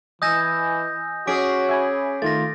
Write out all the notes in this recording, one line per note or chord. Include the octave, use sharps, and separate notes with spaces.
E3 D#5 G#5 D#6 E6 G6 A#6
C#4 F#4 G#4 D6 B6 D7
E5 G#5 B5
D#3 A3 F4 A6 A#6